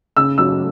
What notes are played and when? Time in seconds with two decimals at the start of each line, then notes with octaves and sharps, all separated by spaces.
0.17 C#3 E6
0.38 F#3 E6